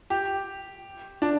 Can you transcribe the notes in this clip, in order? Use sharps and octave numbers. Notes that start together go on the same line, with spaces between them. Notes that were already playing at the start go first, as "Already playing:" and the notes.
G4
D4